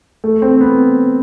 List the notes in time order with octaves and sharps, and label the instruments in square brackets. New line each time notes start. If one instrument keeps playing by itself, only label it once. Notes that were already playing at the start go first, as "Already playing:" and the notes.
[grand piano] A3
C4
B3